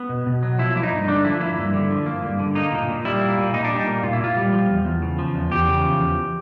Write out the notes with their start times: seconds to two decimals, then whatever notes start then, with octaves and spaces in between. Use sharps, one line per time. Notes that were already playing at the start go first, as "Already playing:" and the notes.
Already playing: B3
0.09 B2
0.26 B2
0.43 F#3
0.59 F3 E4
0.75 A#3 E4
0.83 D#4
0.92 G2
1.08 D3 D4
1.24 F3 E4
1.41 A#3 E4
1.58 G2
1.74 D3
1.91 F3
2.06 A#3
2.23 G2
2.39 D3
2.55 A#3 D#4
2.72 A#2
2.88 A#2
3.05 G3 E4
3.21 A#3
3.38 A#2
3.54 A#2 D#4
3.65 D4
3.71 G3
3.76 D#4
3.87 A#3
4.03 A#2 F4
4.13 E4
4.20 A#2 F4
4.37 G3
4.53 F3
4.69 E2
4.85 E2
5.02 C#3
5.19 F3
5.35 E2
5.51 E2 G4
5.68 C#3
5.83 F3
6.00 E2